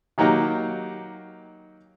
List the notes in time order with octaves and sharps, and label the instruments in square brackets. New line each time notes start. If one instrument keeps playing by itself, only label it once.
[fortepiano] D#3 F#3 A#3 D#4 G4